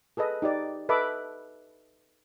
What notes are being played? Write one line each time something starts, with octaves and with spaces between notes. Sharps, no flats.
G#4 A4 B4 D#5
D#4 G4 D5
A4 B4 D#5 E5 B5 D6